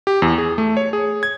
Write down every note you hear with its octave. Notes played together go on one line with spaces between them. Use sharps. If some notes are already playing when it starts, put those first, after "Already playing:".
G4
E2
G#4
A3
C#5
G#4
G#6